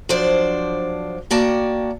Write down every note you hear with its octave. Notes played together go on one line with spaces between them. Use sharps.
F3 F#3 D4 C5 D5
A#3 F#4 D5 G5 A5